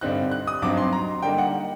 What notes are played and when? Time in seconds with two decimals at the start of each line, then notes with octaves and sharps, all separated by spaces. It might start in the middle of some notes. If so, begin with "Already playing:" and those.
0.01 G2 D3 G3 C4 D#4 F#6
0.32 F#6
0.47 D#6
0.62 G2 F#3 C4 D#4 D6
0.77 C6
0.93 A#5
1.22 D3 G3 A#3 D#4 G5
1.38 F#5